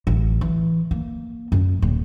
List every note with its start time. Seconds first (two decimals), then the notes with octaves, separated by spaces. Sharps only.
0.07 A1
0.41 E3
0.91 A#3
1.52 F#2
1.82 D#1